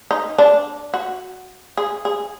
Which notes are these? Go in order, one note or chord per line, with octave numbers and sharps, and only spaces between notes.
D#4
D4
F#4
G#4
G#4